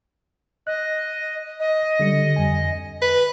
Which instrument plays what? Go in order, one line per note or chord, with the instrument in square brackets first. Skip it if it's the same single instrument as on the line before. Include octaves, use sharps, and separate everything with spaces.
[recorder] D#5 [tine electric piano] F#6
[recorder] D#5
[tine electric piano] D3 G3 C#7
F2 G#5
[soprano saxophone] B4